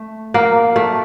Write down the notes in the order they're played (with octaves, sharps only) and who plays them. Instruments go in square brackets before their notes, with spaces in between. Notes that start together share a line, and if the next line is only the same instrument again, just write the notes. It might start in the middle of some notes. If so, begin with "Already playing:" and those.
Already playing: [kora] A3
A#3
A3